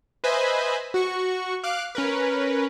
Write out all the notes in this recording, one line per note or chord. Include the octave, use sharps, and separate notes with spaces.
B4 C5 D#5 E5 G#5 B5
F#4 C#6
F5 D6 F#6
C#4 A#4 B4